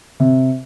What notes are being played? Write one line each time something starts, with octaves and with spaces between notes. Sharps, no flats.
C3